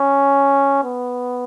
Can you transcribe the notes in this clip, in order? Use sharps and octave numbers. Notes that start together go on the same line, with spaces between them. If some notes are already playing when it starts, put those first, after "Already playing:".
Already playing: C#4
B3